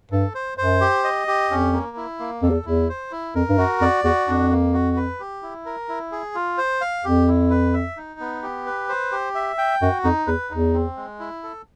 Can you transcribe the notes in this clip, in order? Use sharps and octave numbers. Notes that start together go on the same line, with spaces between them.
G2 A4
C5
F#2 C5
G4
D#5
G4
F2 C#4
A#3
E4
A#3
F2 A4
E2
E2 E4
C5
E4
F2 A#4
G2
F#2 F#4
F2 D5
E2 F#4
F2 D4
A#3
F#4
B4
G4
E4
A#4
E4
G#4
F4
C5
F5
F2 G4
E4
B4
E5
D#4
B3
G4
B4
C5
G4
E5
G5
F#2 F#4
F2 D#4
E2 B4
E2 D#4
C4
G#3
E4
A4